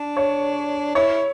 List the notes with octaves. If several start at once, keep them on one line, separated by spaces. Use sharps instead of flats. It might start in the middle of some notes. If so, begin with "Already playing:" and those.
Already playing: D4
C#5
E4 C#5